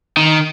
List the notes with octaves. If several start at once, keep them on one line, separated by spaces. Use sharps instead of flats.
D#3